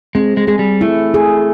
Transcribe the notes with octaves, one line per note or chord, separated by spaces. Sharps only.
G#3 C4
G#3
G#3 G#4
G3
A3 E4
G#4